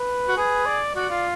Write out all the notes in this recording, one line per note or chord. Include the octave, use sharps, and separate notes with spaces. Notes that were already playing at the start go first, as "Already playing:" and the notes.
Already playing: B4
F#4
G#4 B4
D5
F#4 D5
F4